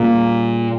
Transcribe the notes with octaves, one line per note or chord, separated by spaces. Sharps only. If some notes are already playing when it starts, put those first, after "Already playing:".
Already playing: A#2 G3 A#3 C#4 G#4